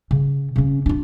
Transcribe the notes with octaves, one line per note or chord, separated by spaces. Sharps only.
C#3
C#3 C#4
D4 F4